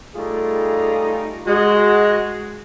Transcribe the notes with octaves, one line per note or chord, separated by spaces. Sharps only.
G3 A3 D#4 F4 G#4
G#3 F#4